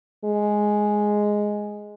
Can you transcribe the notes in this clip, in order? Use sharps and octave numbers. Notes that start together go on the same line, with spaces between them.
G#3